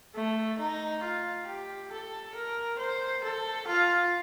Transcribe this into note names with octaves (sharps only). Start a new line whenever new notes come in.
A3
D#4
F4
G4
A4
A#4
C5
A4
F4